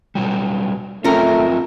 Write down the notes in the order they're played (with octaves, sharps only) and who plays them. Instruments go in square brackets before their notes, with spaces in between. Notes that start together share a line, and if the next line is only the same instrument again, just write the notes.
[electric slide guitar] B2 F#3 G3
[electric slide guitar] F#3 C4 F4 [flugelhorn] A3 [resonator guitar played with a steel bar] C#4 A#4